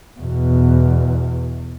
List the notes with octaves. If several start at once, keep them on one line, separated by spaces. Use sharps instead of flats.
E2 B2